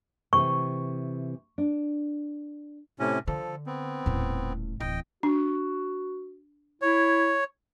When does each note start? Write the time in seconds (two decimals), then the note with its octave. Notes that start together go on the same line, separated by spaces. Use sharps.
0.33 C3 E3 A3 C#6
1.58 D4
2.99 A2 C3 C#4
3.28 D3 F3 A4
3.66 B3 C4
4.06 D#1 A2
4.80 D1 E3 D#5 G5
5.23 D4 F#4
6.82 E4 C#5